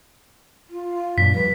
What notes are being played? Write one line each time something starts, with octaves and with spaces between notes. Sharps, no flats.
F4
F#2 A#2 D4 B6
F3 G3 B4